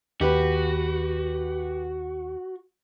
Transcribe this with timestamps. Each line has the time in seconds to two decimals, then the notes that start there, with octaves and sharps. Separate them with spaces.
0.21 D#2 F#4 G4 B4